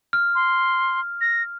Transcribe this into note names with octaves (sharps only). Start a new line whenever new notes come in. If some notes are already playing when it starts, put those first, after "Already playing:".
F6
C6
A#6